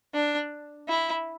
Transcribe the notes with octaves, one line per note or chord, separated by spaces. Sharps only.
D4
E4